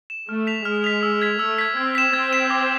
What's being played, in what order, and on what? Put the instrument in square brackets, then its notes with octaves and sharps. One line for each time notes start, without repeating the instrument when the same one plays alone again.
[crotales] E7
[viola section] A3 [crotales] F6
[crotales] B6 F7
[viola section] G#3 [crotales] F6
[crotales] B6 F7
E6
G#6 B6
[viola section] A3 [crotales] E6
[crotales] G#6 B6
[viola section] C4 [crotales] G#6
[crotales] B6 E7
[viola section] C4 [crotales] G#6
[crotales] B6 E7
D6